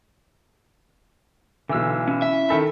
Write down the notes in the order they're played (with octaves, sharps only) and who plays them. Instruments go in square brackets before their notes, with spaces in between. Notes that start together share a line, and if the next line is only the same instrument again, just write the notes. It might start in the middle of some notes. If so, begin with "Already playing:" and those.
[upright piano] B1 E3 [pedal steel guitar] D3 E6
[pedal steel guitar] C#4 E4
[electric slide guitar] E5
[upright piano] D#3 A4 B5